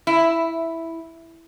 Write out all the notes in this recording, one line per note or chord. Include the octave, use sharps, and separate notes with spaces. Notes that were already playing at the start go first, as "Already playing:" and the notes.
E4